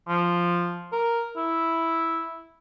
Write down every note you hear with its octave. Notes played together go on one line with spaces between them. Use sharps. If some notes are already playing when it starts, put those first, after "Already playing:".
F3
A#4
E4